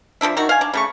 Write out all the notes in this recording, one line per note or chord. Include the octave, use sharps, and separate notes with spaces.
F3 A#3 D4 E5
D#3 F#4
F5 G#5
D4
C#3 A3 C#6